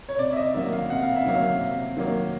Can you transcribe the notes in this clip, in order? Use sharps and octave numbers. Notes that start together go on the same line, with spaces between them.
C#5
C3 D5
E5
D#5
D#3 F#3 A#3 E5
F5
C3 F#5
F5
E5
D#3 F#3 A#3 F5
C3
D#3 F#3 A#3